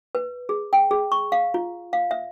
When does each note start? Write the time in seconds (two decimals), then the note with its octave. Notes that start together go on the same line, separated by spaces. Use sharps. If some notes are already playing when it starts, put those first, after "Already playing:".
0.15 B4
0.49 G#4
0.73 G5
0.91 G#4
1.12 C#6
1.32 F5
1.54 F4
1.93 F5
2.11 E5